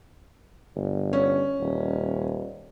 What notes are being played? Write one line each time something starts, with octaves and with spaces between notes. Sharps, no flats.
G1
C#4
D#1